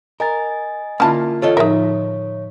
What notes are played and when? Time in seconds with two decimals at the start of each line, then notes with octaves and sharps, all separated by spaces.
0.20 A#4 D#5 G#5 A6
1.00 D3 A#3 C#4 E4 F4 A5 B5 F6
1.42 F4 A4 C#5 D#5
1.57 A2 F3 D#4 G#4 A#4 E5